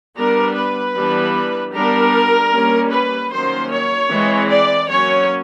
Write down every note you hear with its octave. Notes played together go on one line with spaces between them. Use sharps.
G3 B3 D4 A#4
B4
E3 G3 B3 D4
G3 B3 D4 A#4
G3 A#3 C#4
B4
D#3 F#3 A#3 C#4 C5
C#5
E3 G#3 C4
D5
F#3 A#3 C#4 C#5